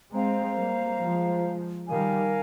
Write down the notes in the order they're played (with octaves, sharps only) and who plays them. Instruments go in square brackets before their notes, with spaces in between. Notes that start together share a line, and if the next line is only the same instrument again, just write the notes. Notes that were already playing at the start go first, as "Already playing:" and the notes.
[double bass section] G#3 C4 [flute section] C5 F5 A#5
[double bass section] G3 A#3
F3 G#3
[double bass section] D#3 G3 [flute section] A#4 F5 G#5